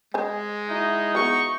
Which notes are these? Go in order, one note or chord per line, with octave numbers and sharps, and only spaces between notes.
G#3 C5 D#5 G#5
D#4 E4 F#4
F#3 G#3 B3 E5 F5 C#6 D#6